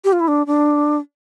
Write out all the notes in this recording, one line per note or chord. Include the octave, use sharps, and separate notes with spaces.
G4
F4
E4
D4
D4